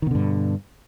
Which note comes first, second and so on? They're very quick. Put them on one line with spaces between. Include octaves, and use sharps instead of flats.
D#3 B2 D3 G2